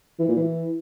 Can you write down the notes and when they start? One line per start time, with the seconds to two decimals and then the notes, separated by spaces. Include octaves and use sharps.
0.19 E3
0.28 A#2
0.37 E3